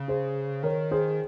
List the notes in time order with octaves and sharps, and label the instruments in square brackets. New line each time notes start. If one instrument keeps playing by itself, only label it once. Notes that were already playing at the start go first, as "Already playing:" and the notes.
Already playing: [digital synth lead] C#3
[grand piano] G#4 C5
[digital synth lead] D#3 [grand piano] A#4 C#5
[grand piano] G#4 C5